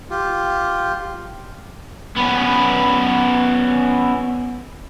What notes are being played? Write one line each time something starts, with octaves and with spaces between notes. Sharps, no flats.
F4 G4
B3 C#4